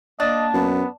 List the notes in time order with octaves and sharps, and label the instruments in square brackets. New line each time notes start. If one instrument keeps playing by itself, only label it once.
[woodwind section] A#3 A5 [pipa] D4 [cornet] D#5
[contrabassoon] F#2 [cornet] B3